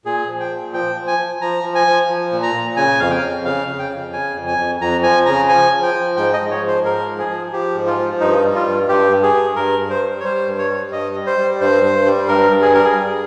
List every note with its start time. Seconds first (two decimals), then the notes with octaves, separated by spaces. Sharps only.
0.05 A#2 G#4
0.28 F3
0.40 G5
0.51 A#2
0.73 F3 G5
0.96 F3
1.07 G#5
1.18 F3
1.41 F3 A#5
1.64 F3
1.75 G#5
1.87 F3
2.09 F3
2.32 A#2
2.43 A#5
2.55 A#2
2.77 C#3 G#5
3.00 F2 F5
3.11 G5
3.23 F2
3.45 C#3 F5
3.68 C#3
3.79 G5
3.90 F2
4.13 C#3 G#5
4.36 F2
4.47 G#5
4.58 F2
4.80 F2 A#5
5.03 F3 G#5
5.26 C#3 A#5
5.49 F3 G#5
5.72 F3
5.83 G5
5.94 F3
6.16 G#2 G5
6.33 D#5
6.40 G#2
6.51 C#5
6.62 F3
6.68 C5
6.84 G#2 A#4
7.07 F3
7.19 G#4
7.30 F3
7.52 F3 G4
7.75 G#2
7.87 F4
7.98 F3
8.20 G2 D#4
8.44 G3
8.55 F4
8.66 G2
8.89 G2 G4
9.11 G2
9.23 G#4
9.34 G2
9.56 G2 A#4
9.79 G2
9.90 C5
10.02 G3
10.20 C#5
10.24 G3 C5
10.47 G2
10.59 C#5
10.70 G3
10.92 G2 D#5
11.15 G3
11.27 C5
11.38 G3
11.61 G2 C5
11.83 G2
12.06 G3
12.28 G2 A#4
12.51 G2
12.62 G#4
12.74 G3 A#4
12.84 G#4
12.96 G3